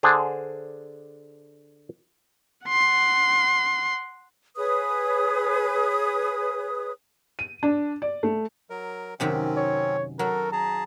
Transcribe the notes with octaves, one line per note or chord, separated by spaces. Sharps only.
D3 D4 G#4 C5
F#5 C6
G#4 B4 C#5 D#6
D#7
D4
D5
A3
F#3 A#4
F#2 C3 D#3 F#3 C4 C#4
C#5
F#3 F#4 A4 A#4
G#4 A5 A#5